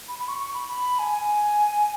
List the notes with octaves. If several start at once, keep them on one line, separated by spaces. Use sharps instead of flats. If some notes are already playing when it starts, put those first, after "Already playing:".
B5
B5
C#6
C#6
B5
B5
G#5
G#5